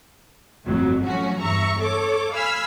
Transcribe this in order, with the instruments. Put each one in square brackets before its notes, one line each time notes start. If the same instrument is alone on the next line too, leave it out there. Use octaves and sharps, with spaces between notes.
[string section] G1 F2 A2 F#3
F3 F#3 A3 C#4 F#4
E2 G2 E5 A#5 C#6
A4 C#5 D6
F5 G#5 B5 E6 F6